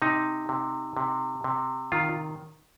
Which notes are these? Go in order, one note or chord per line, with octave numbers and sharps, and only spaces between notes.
C3 D#4
C3
C3
C3
D#3 F4